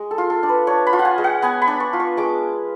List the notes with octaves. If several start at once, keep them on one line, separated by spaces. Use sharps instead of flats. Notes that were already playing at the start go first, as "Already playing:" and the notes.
Already playing: G#3
A4
F4
A4
D4
B4
D4 C#5
B5
F4
F#5
G#5
G#3
F#5
B3 G#5
B5
D4
C#6
F4
C#6
G#3 D6